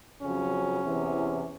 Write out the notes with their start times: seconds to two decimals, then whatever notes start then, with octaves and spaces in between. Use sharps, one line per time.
0.21 F2 C#3 F#3 C#4
0.82 E2 C3 E3